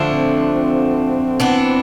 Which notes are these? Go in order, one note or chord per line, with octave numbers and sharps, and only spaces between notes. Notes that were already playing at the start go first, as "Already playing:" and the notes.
Already playing: D3 F3 A3 D4
C4
C4
E3 B3 D4